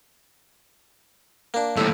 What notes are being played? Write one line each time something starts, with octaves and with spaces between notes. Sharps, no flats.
A#3 D4
D#2 A2 A3 E4